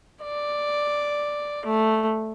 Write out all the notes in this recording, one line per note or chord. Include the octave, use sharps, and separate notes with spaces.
D5
A3